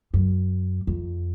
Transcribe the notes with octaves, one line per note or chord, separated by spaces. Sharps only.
F#2
F2